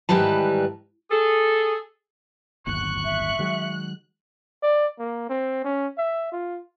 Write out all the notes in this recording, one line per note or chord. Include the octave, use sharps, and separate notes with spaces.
G#2 D#3 E3 G3 B4 A5
G#4 A4
D1 G1 D#2 C#6 F#6
E5
D#3 F#3 G#3
D5
A#3
C4
C#4
E5
F4